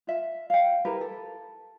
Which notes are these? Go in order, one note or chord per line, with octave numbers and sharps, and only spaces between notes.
F4 E5
F5 G5
E4 G4 A#4 B4
A4